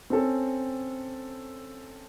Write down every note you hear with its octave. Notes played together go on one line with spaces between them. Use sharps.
C4 C#4 A4